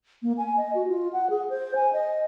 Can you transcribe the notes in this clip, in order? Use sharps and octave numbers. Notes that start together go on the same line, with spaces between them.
A#3
G#5
D#5
F#4
F4
F#5
G#4
C5
G#5
D#5